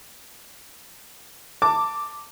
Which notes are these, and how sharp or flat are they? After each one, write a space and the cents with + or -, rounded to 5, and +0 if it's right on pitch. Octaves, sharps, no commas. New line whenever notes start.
A5 +20 D6 +0